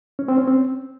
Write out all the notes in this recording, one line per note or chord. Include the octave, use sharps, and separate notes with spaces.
C#4
C4
C#4
C4